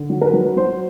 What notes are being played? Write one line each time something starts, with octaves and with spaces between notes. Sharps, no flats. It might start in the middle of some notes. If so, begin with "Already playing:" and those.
Already playing: D3
F#3
A#4
B4
F#3
F#3 C5